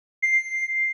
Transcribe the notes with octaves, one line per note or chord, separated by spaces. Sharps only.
C7